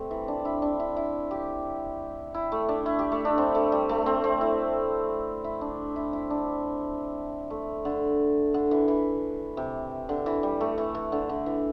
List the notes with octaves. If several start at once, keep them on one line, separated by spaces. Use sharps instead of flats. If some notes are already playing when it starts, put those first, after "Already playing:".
Already playing: G3 A3 C4
E3
D4
E4
D4
E4
E4
G4
E4
A3
D4
E4
G4
A3
D4
C4
A3
G3
A3
C4
C4
E4
E4
D4
E4
E4
D4
A3
D3
D3
E3
E3
C3
D3
E3
G3
A3
E3
E3
D3
D3
E3